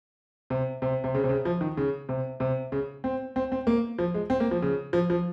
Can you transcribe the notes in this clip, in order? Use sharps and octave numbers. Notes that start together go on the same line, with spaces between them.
C3
C3
C3
C#3
C3
C#3
F3
D#3
C#3
C3
C3
C#3
C4
C4
C4
A#3
F3
G#3
C4
A#3
F3
C#3
F3
F3